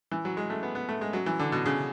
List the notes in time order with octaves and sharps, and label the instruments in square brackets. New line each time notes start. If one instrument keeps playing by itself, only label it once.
[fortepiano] E3
F#3
G#3
A3
B3
B3
A3
G#3
F#3
E3
D3
B2
C#3